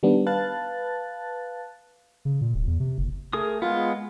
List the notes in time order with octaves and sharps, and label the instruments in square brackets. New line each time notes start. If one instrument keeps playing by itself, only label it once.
[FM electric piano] D#3 G3 B3 D4
B4 F5 A5 F#6 A6
[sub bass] C#3
A#2
D1
E2
C3
F#1
[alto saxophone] A3 [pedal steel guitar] G#4 A#4 D#6
[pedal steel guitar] G#3 B3 [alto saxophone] F4